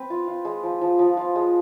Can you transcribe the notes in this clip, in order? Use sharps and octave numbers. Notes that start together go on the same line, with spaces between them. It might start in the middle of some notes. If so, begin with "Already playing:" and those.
Already playing: C4 B4
F4
F4
G#3
F3
F3
F3
F4
G#3